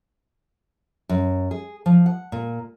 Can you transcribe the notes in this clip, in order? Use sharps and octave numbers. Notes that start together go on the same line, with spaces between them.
F#2
G#4
F3
F#5
A#2